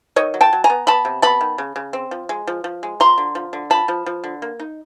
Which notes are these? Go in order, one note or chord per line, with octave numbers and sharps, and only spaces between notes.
D#3 C#5 D#5
F#3
G5 A5
F#3
G#5 A#5
B3
B3 A5 B5
C3
B3 A5 B5
D#3
C#3
C#3
C4
F3
G#3
F3
F3
G#3
F3 A#5 C6
D3
F3
D3
F3 A5 B5
F3
F3
D3
A#3
D#4